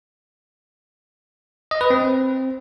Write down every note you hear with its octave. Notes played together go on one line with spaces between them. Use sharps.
D#5
B4
C4